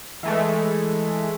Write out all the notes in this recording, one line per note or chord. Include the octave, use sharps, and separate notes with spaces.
E3 G#3 A3